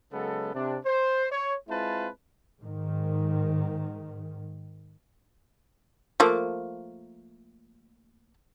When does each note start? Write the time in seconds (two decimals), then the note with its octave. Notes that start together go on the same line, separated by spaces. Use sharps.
0.13 C#3 F#3 G#3 B3 A4
0.54 C3 D4
0.85 C5
1.32 C#5
1.68 G#3 C4 E4 F4 B4 A5
2.62 G#2 D#3
6.20 F3 A3 A#3